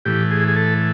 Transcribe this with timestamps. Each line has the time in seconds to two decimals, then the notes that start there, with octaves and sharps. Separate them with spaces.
0.05 A2 E3 G4
0.31 G#4
0.48 G#4
0.56 A4